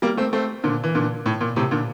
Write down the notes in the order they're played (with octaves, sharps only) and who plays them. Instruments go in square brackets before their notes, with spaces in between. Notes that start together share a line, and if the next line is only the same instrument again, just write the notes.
[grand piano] G3 A#3
A3 C4
A3 C4
A#2 D3
E3
A#2 D3
A2
A#2
A2 C3
A#2 D3